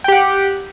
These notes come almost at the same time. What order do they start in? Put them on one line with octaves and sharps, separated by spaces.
G5 G4 F#5